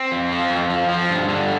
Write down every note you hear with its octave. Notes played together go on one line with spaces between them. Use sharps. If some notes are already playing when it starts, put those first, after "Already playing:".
Already playing: C4
F2
F3
F2
F3
F3
G2
D3